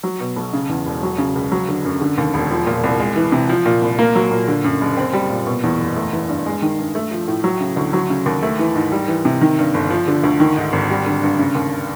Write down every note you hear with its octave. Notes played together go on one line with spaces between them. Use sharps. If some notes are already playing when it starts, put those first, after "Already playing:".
F#3
B2
B1
C#3
E2
E1
F#3
C#3
C#2
F#3
D3
F#2
D3
D#2
E1
F3
A#2
C2
G#3
E3
C3
F3
A#2
C2
A#3
F#3
A#2
D3
F#2
F#1
C4
G3
A#2
B2
E2
F#1
A3
E3
G2
G#3
D#3
G2
A3
F3
A2
F#3
C#3
D2
F#3
C#3
D#2
A3
E3
G#2
G3
E3
C3
D#3
G2
G1
F3
D3
D2
D#3
G#2
G#1
G3
D3
G2
C#3
D#2